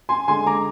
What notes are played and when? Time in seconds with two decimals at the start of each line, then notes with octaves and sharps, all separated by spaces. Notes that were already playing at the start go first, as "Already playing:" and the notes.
0.09 G#5 C6
0.28 D3 G#3 G#5 C6
0.46 A#5 D6